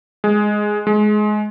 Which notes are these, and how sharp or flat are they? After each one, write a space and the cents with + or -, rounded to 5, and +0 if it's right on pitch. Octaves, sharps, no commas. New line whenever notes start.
G#3 +0
G#3 +20